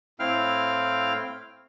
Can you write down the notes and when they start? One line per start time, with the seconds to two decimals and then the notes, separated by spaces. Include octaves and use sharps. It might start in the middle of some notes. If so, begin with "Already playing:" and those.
0.20 A2 C4 E4 F5 G5 F6